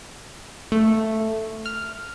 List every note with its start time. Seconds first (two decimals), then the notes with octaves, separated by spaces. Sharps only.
0.72 A3
1.66 F6